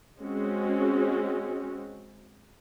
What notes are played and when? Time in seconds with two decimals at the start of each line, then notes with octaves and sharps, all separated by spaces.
0.20 G#3 C4 C#4 F#4